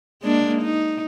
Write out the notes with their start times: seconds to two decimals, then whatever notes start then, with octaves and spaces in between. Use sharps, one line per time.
0.22 G#3 A#3 D4
0.62 D#4